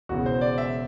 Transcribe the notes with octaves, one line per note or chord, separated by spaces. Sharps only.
E1 E2 C#3 F#4
C5
D5
E5